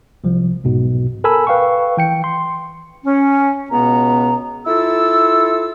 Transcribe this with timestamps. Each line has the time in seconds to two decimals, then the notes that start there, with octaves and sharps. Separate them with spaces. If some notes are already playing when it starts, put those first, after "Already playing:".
0.24 C2 F3
0.64 B1 G#2 B2
1.24 A4 A#4 G#5 B5 E6
1.47 B4 F5 G5 C#6
1.97 E3 G5 C#7
2.24 C6
3.04 C#4
3.70 C#2 B2 B3 A#5
4.65 E4 F4 A4 E6